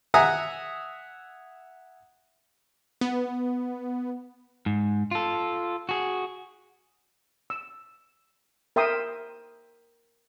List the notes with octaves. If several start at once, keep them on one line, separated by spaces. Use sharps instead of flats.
E5 F#5 G#5 A#5 D#6
B3
G#2
F4 A4
F#4 G#4
E6
A#4 E5 G5 C6 D#6